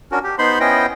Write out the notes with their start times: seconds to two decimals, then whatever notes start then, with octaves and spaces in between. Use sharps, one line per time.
0.12 C#4 D4 F#4 A#4
0.24 G4
0.39 B3 D#4 C5 B5 C6
0.60 B3 C#4 E4 C5 D#5 G5